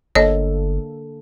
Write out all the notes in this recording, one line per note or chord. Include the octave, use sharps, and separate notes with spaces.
G1 D3 A#3 A4 C#5 D#5